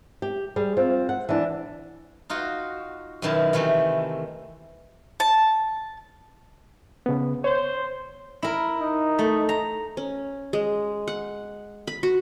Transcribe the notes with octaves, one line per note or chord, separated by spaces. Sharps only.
G4
G3 G#4
C4 F4
F#5
E3 D4
D#4 F4 F#4
F#2 B2 D#3 E4 A5
C3 D#3 E3 A3
A5
C#3 B3
C5 C#5
E4 A#4
D#4
A3
A#5
C#4
G#3
F#5
B5
F#4